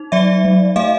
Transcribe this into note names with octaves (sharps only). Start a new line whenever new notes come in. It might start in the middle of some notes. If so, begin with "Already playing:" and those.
Already playing: D#4
F#3 D5 E5
F#3
A3 D#5 F5